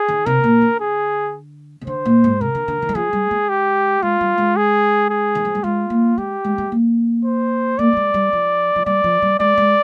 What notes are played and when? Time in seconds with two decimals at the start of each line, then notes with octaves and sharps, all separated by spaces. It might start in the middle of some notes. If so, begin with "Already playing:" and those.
Already playing: G#4
0.08 D#3
0.26 C3 A#4
0.44 A#2
0.62 D3
0.80 G#4
1.81 C3
1.87 D3 C5
2.05 A#2
2.24 G#2
2.41 C3 A#4
2.55 D3
2.68 D3
2.82 D#3
2.89 G3
2.95 F3 G#4
3.13 G3
3.31 G#3
3.49 G4
4.02 G#3 F4
4.21 G3
4.38 G#3
4.56 G#4
5.10 G#4
5.35 D#3
5.45 F3
5.55 G3
5.64 G#3 F4
5.90 A#3
6.18 G#3 G4
6.44 G#3
6.58 G#3
6.72 A#3
7.25 C5
7.79 A#3 D5
7.93 G3
7.97 G#3
8.14 G3
8.33 F3
8.76 F3
8.86 G3 D5
9.04 F3
9.22 G3
9.40 G#3 D5
9.58 G#3